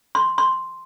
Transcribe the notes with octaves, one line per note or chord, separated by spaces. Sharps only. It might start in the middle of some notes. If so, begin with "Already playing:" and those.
C6
C6